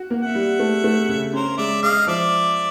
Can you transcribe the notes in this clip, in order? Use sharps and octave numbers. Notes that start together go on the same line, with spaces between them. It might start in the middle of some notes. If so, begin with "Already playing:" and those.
Already playing: F#4
A#3
E5 F#5
G3
A3
A3
C#3
C#4 A#4 C5
G#3 D5 E5
G#3 D#5 F5
F3 D5 E5